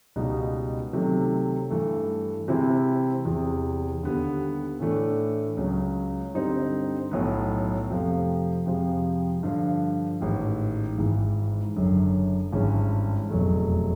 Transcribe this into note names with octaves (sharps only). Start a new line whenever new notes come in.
C#2 B2 G3 B3 D#4
C3 D#3 F#3 A3
G2 E3 A3
C3 E3 G#3 C4 E4
E2 C3 E3
D#2 D3 G3 B3
A2 E3 A3 D4
C#2 C#3 F#3
G2 D3 G3 C4 D#4
B1 A2 F#3 B3
F2 C3 F3 A3
F2 C3 F3 G#3
G2 D3 F3
A1 G#2 D#3
G#1 G#2 E3
F#1 F#2 D3
G#1 G2 E3 G#3 C#4
F1 E2 B2 F#3 A3